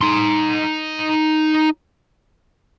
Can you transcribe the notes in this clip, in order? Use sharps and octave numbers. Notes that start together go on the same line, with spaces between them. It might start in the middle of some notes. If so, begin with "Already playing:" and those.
D#4 C6